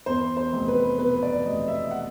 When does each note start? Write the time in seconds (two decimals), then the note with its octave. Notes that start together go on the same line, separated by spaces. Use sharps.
0.06 E2 C5
0.37 C5
0.53 F1
0.68 B4
0.99 B2 B4
1.23 D5
1.45 F1 D#5
1.68 E5
1.91 F#5